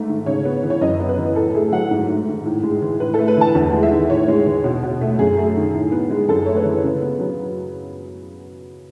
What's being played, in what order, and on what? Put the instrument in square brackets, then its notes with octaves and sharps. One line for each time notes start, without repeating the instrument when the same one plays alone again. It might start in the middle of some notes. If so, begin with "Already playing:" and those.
Already playing: [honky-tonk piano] G#2 A3
D#3
C#3 C#5
B3
E3
C#5
F#2 D#5
B3
B4
E3
A2 A4
A3 G#4
F#3 F#5
G#2
A3
D#3
A2
G#3
E3
A2 B4
A3 A4
B4
E3 A5
E2
G#3
E5
D#3
A2 C#5
G#3
E3
B2
B2
A3
F#2 G#4
A3
D#3
A2
B3
G#3
F#2 A4
A3 C#5
B4
E3
C#3
B3
F#3